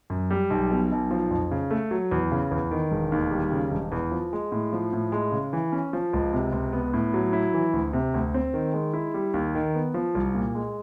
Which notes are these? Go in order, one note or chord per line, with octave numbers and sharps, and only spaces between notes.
F#2
G3
B1
B2
B1
F3
F2
C#3
A3
F#3
E2
C#3
E2
D#3
E1
D#2
G3
C#3
E1
E2
F3
G#3
A2
F3
A2
G#3
C#3
E3
C#4
F3
C#2
C3
C#2
B3
A2
F#3
E4
E3
D2
C3
D2
C4
D#3
G#3
E4
G3
D#2
D#3
B3
F3
C2
A#2
G#3